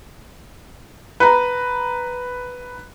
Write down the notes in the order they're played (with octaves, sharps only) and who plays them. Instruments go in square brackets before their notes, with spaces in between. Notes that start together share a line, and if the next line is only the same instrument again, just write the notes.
[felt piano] B4 A#5